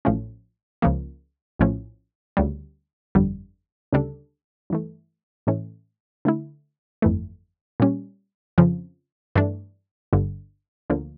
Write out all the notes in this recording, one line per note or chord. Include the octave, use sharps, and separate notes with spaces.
A1 A2 F3 A3 C#4
C#2 C#3 F3 A#3
A#1 A2 F3 C#4
D2 C#3 G3
G1 F2 D3 G3
D2 C#3 G3 D4 A4
G2 E3 A3
A2 E3 A3 C#4
D3 A3 E4
G1 F2 E3 A3
A#2 G3 C#4
F2 C#3 F3
G2 E3 A3 D4
G1 G2 D3
D2 D3 F3 A#3